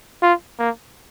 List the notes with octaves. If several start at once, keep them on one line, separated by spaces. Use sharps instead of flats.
F4
A#3